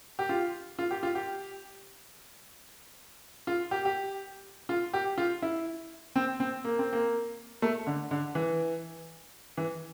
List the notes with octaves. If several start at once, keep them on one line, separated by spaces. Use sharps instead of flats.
G4
F4
F4
G4
F4
G4
F4
G4
G4
F4
G4
F4
E4
C4
C4
A#3
C4
A#3
A3
D3
D3
E3
E3